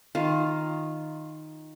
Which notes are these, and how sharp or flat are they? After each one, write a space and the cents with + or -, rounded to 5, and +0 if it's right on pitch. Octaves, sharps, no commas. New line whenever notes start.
D#3 +0 F4 +0